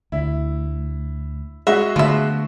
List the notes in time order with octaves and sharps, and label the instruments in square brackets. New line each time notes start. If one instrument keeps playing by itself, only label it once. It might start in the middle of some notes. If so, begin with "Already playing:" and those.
[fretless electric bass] D2 [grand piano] E4
[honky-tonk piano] G#3 [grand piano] F#4 D#5 [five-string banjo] E5
[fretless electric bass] D3 A3 B3 [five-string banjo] F3 E5